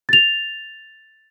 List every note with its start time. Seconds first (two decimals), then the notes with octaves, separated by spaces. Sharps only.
0.09 A6 F7